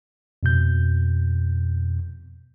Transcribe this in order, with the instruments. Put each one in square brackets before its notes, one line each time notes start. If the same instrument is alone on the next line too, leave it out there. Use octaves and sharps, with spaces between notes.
[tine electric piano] F2 B2 G6